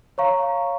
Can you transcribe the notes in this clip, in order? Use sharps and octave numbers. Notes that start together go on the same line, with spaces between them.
C#5 F5 A#5 C#6